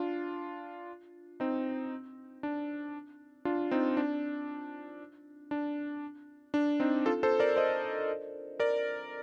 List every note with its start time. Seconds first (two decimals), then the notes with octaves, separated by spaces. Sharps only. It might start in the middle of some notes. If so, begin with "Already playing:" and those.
Already playing: D4 F4
1.40 C4 D#4
2.43 D4
3.45 D4 F4
3.71 C4 D#4
3.97 D4
5.51 D4
6.54 D4
6.80 C4 D#4
7.06 F4 A4
7.23 A4 C5
7.39 A#4 D5
7.56 C5 D#5
8.60 A#4 D5